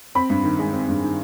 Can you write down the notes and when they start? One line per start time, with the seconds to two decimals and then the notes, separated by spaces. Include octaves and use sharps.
0.15 C4 B5
0.30 G2
0.44 D#3
0.59 G#3
0.73 C4
0.88 G2
1.03 D#3